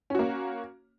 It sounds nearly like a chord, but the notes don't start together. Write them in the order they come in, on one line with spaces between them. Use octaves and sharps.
C#4 F#4 A#3